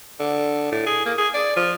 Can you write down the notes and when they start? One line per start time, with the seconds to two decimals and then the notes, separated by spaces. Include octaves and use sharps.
0.20 D3
0.72 A2
0.86 G#4
1.06 A#3
1.18 G#4
1.34 D5
1.56 F3